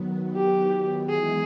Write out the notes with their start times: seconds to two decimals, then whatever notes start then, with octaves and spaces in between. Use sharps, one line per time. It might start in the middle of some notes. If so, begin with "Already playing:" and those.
Already playing: D#3 F#3 B3
0.36 G4
1.08 E3 G#3 B3 E4 G#4